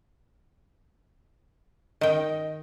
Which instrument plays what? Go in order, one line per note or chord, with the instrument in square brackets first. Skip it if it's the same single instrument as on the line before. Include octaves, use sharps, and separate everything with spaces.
[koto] D#3 G5 [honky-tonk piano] D#5